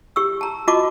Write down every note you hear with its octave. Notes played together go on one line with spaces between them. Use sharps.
G4 C#6 E6
A5 A#5
F4 F#4 D#5 A5 C#6 D6